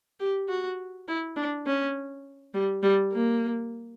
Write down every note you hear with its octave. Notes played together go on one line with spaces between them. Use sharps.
G4
F#4
E4
D4
C#4
G3
G3
A#3